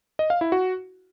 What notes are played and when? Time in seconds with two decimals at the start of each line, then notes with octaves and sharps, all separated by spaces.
0.19 D#5
0.30 F5
0.41 E4
0.52 F#4